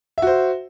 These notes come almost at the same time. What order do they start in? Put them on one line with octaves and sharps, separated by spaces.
E5 F#4 C5